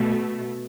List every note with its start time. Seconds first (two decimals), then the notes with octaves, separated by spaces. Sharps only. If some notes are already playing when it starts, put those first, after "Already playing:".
Already playing: B2 A3